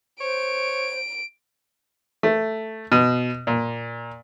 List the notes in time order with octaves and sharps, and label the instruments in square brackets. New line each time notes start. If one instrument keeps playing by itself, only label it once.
[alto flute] C5 [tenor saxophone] C#5 [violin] D7
[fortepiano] A3
B2
A#2